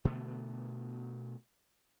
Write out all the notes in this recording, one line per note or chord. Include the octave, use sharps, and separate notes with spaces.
B2 D3 A3 B3